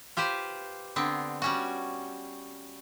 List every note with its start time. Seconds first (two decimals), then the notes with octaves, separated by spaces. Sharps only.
0.17 F4 G4 B4 C5
0.96 D3 B3 C4
1.42 G3 C#4 F#4